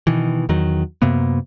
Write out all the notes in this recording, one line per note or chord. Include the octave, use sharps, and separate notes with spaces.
B2 D#3 E3
E2 D#3 F#3
F#2 C3 A#3 B3